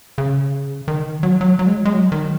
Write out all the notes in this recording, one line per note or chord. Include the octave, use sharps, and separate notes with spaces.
C#3
D#3
F#3
F#3
F#3
G#3
F#3
G#3
F#3
D#3